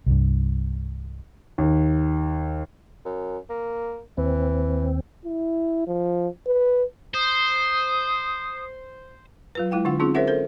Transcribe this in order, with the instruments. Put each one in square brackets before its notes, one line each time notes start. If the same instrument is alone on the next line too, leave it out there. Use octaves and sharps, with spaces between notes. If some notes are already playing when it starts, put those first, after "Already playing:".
[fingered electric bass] C2 G2
[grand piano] D#2
[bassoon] F#2
A#3
[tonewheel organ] D#2 C4 [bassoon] E3
[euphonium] E4
F3
B4
[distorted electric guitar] C5 [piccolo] D#6
[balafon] F#3 F4 B4
G#3 E4 F5 G5
D3 D4 F4 F#5
C4 C#4 D#4 F4 G#4
G#4 A#4 C5 C#5 E5 F#5
A4 A#4 C5